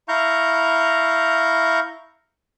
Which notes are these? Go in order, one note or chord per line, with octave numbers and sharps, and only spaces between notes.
E4 F5 A#5 C#6 G6